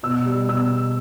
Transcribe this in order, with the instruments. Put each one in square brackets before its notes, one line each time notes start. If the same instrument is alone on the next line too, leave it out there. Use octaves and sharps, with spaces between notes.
[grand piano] B2 E6
G3
B2 E6